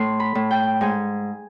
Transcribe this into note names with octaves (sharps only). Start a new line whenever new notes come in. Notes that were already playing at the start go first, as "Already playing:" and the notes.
Already playing: A2 C6
B5
A2
G5
G#2 G#5